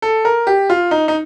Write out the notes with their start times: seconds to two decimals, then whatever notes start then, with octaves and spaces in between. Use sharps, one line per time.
0.02 A4
0.25 A#4
0.47 G4
0.70 F4
0.91 D#4
1.08 D#4